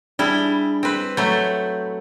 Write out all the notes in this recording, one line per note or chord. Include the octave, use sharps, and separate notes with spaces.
G3 D4 E4 G#4
C4 B4
F#3 A3 B5 G6